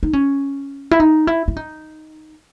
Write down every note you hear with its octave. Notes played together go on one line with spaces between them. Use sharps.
D#4
C#4
E4
D#4
E4
E4
D#4